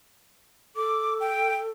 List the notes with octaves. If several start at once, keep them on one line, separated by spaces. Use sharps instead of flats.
A4 D6
G5